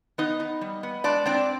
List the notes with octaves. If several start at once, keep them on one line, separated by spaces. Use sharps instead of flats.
B3 D#4 D#5
D#4
G3
B3
G#3 D4 D5
C4 D4 D5